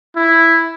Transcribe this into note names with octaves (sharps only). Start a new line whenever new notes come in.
E4